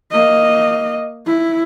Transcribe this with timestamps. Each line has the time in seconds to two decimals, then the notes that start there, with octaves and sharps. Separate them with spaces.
0.11 A#3 D#5
1.26 E4